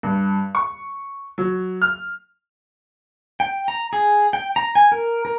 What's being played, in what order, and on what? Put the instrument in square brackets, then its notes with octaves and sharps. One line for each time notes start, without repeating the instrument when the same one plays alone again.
[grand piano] G2
C#6
F#3
F6
[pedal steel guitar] G5
A#5
G#4
G5
A#5
G#5
A#4
A#4